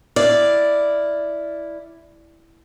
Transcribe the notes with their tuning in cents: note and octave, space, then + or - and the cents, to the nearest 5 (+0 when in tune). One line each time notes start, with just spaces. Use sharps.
E4 +0 D5 +0 F5 +0